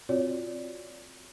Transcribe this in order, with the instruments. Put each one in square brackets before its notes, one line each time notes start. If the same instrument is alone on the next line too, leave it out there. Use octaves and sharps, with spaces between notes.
[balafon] C4 F4 F#4 C#5 D5